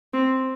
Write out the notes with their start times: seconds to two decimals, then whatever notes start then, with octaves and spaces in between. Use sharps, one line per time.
0.13 C4